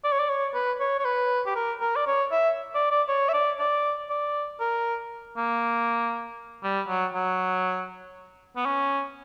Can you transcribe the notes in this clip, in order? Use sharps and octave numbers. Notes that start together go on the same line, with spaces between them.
D5
C#5
D5
C#5
B4
C#5
C#5
B4
G4
A#4
A#4
D5
C#5
E5
D5
D5
C#5
E5
D5
D5
D5
A#4
A#3
G3
F#3
F#3
B3
C#4